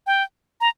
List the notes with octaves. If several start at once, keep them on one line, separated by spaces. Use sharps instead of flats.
G5
A#5